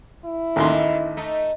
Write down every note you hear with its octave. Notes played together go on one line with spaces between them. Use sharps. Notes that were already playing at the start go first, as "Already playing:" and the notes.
E4
A1 D#2 D#3 C6
A3 D#4